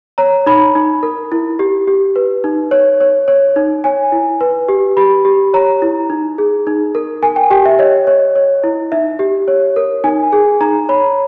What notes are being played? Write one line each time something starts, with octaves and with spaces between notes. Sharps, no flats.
C#5 A#5
D#4 B5
D#4
A#4
E4
G4
G4
B4
D#4
C#5
C#5
C#5
D#4
C#5 G#5
E4
B4
G4
G4 B5
G4
C#5 A#5
E4
D#4
G#4
D#4
A#4
A#4 G#5
G5
G4 G5
E5
C#5 D#5
C#5
C#5
E4
D#4 E5
G4
C#5
A#4
D#4 G#5
G#4
D#4 A#5
C#5 B5